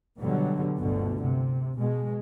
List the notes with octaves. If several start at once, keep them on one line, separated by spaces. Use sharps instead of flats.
B2 D3 F#3 G3
G1 D2 B2 D3
C3
B2 G#3